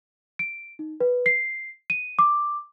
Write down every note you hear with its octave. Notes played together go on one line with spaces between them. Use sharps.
D7
D#4
B4
C7
D#7
D6